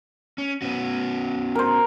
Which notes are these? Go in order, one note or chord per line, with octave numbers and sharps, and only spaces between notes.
C#4
B3 C#4 F#4
A#4 C5